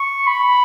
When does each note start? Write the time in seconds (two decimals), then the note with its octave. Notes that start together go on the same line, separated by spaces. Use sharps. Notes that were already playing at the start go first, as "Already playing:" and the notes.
Already playing: C#6
0.27 B5